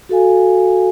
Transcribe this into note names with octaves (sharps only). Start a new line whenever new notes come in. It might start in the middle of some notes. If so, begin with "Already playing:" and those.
F#4 A4 F5 G#5